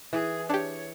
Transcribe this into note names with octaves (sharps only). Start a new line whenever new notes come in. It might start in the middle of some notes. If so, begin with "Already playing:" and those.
E3 G#4
D4 G4 C#5